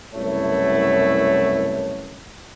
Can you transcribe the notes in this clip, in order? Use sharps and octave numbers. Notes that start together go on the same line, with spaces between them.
C2 F#2 B2 A3 E4 C#5